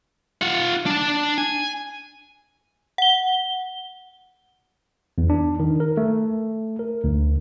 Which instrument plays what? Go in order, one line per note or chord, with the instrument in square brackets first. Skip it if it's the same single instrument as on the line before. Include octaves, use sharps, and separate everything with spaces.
[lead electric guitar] F4 F#5
D4 A5
G#5
[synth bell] F#5 G7
[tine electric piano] E2
D4
D#3
A#4
A3
A#4
D2